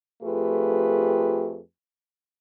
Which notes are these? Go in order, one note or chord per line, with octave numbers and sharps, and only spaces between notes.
F2 A3 F4 G4 G#4 B4